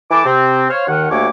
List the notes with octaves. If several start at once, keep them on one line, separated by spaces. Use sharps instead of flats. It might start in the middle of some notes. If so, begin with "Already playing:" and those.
E3 A3 A5 D6
C3 C4
C5 C#5 F5
D#2 D#3 F#5
D2 G3 A3 A#3 C#5 D6